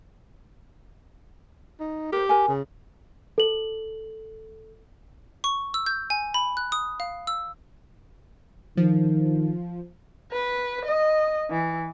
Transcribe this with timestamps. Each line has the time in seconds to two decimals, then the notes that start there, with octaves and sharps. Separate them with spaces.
1.80 D#4
2.13 G4 A#4 C5
2.29 A#4 G#5
2.48 C#3
3.38 A4 F#7
5.44 C#6
5.74 E6
5.86 G6
6.10 G#5
6.34 B5
6.57 F#6
6.72 D#6
7.00 F5
7.27 E6
8.77 D#3 F3
10.32 B4
10.85 D#5
11.50 E3